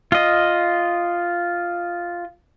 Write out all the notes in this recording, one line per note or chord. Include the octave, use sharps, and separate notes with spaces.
F4 D#5